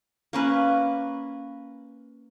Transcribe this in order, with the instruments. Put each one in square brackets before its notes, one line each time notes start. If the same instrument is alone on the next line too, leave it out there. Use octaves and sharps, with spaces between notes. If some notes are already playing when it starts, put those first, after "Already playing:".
[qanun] A#3 C#4 B4